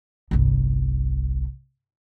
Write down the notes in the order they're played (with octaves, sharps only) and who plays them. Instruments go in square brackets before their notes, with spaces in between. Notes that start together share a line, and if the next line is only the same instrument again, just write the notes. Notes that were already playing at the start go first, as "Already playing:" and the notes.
[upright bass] G1 C2